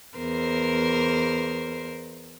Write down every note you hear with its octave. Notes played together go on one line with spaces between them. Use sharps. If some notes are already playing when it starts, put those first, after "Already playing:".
E2 A#4 C5